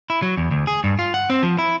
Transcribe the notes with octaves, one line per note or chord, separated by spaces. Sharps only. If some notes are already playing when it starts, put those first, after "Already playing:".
E4
F#3
E2
D2
G#4
G2
F4
F#5
C4
F3
E4